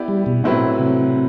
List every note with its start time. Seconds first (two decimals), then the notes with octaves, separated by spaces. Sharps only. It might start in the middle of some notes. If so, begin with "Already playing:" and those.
Already playing: B3 E4 G4 D5
0.08 G3
0.26 B2
0.44 A2 F#3 C4 E4 B4
0.79 C3